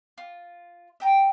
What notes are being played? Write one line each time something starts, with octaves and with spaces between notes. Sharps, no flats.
F4
E5 G5 A#5